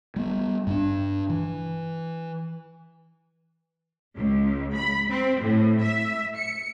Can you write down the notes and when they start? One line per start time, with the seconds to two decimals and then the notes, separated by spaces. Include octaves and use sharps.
0.16 G3 B3
0.67 G2 C#4 D4
1.30 E3
4.16 C#2
4.77 B5
5.10 C4
5.41 A2
5.83 E5
6.36 C#7